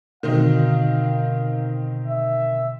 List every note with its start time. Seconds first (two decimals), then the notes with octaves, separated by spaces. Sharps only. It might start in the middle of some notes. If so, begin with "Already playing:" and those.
0.23 B2 D3 D#3 C4 D#4 F#4 F5
2.06 E5